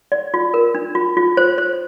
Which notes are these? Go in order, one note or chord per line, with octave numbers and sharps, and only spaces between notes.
D5
F4
A#4
D4
F4
F4
C5
C5